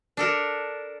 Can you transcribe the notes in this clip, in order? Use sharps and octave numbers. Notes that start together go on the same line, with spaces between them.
D4 A4 A#4